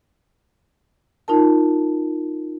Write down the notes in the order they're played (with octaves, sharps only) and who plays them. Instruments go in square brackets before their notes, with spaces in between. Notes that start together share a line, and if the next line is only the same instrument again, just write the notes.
[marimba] D#4 F4 A#4 A5